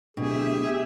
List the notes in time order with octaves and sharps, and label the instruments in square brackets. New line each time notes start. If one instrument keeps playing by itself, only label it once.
[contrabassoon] D1 [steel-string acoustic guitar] B2 [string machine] G4 E5 [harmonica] G#4